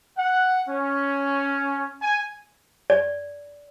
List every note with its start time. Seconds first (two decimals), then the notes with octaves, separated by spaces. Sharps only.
0.17 F#5
0.69 C#4
2.02 G#5
2.90 D5